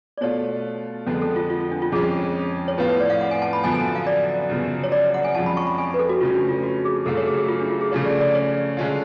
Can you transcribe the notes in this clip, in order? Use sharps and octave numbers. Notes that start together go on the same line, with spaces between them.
D5
B2 A3 F4 C#5
F2 D3 G#3 B3
A4
F4
F4
F4
D4
F4
F2 F3 G#3 C#4 G#4
C#5
A2 F3 B3 F4 B4
B4
D5
F5
F#5
G#5
A5
B5
F#2 D3 F3 B3 G#5
G#5
F5
D5
F#2 C#3 F3 B3
C#5
D5
F#5
G#5
F2 F3 G#3 C#4 F4 A5
B5
C#6
B5
G#5
B4
A4
F#4
C#3 F3 A3 C#4 F4
D4
F4
F#4
G#4
F#2 C#3 F#3 A3 F4 A4
C#5
G#4
G#4
F4
D4
F4
G#4
C#3 F3 A3 C#4 F4 C#5
D5
D5
C#5
D3 G#3 C#4 F4